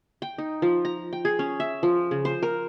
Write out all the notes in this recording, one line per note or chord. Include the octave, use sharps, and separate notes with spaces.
G5
D#4
F3
A#5
G5
G#4
C#4
E5
F3
C#3
C5
A#4